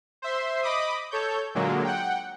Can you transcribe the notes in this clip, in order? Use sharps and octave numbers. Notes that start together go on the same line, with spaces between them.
C5 E5 C6
D#5 B5 D6 D#6
A4 C#5 G6
A#2 D3 F#3 G#3 A#3
F#5 G5